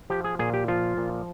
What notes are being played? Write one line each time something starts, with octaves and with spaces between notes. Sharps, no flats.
F3 G4
G#4
A#2 G#4
G4
F3 F4
A#2